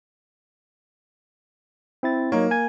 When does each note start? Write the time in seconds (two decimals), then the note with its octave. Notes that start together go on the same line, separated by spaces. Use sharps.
2.03 C4 E4 A6
2.32 F#3 A#3 D#4 C#5
2.51 G#5 G#6